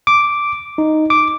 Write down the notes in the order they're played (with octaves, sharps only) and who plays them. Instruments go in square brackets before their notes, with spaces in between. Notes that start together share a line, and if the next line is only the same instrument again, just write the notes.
[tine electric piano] D6
D#4
D6